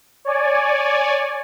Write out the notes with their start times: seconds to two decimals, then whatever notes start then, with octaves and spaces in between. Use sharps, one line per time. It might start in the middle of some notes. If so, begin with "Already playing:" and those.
0.25 C#5 D5 G#5